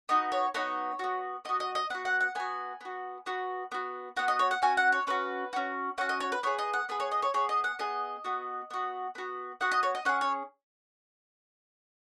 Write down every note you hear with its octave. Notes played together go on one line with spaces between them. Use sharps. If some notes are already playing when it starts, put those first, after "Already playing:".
B3 D#4 F#4 D#5
C#5
B3 D#4 F#4 C#5
B3 F#4
B3 F#4 D#5
D#5
D#5
B3 F#4 F#5
F#5
F#5
B3 F#4 G#5
B3 F#4
B3 F#4
B3 F#4
B3 F#4 F#5
D#5
C#5
F#5
C#4 F#4 G#5
F#5
C#5
C#4 F#4 B4
C#4 F#4
C#4 F#4 F#5
D#5
C#5
B4
B3 G#4 C#5
D#5
F#5
B3 G#4 B4
C#5
D#5
C#5
B3 G#4 C#5
D#5
F#5
B3 G#4 D#5
B3 F#4
B3 F#4
B3 F#4
B3 F#4 F#5
D#5
C#5
D#5
C#4 G#4 F#5
C#5